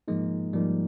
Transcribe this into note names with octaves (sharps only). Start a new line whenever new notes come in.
G#2 F3 G#3 A#3 D#4
G#2 F3 G3 A#3 D#4